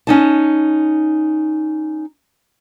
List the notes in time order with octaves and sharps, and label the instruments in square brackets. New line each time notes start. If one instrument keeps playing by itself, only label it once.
[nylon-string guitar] C#4 D#4 A5